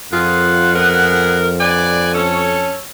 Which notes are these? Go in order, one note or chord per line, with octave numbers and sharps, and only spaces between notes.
F2 F4 G#4 A#4 F#5
B3 G#4 A#4
D3 B4 D5 G#5
C#4 A4 C#5